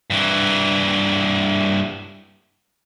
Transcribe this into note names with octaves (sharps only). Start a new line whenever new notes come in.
G2 E3